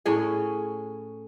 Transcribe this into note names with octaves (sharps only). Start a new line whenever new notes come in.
A2 C#4 G#4